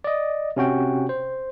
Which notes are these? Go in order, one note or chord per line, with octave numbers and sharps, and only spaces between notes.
D5 D#5
C3 C#4 F#4 G5
C5